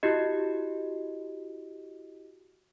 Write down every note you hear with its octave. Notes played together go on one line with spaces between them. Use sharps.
E4 F#4 G4 D#5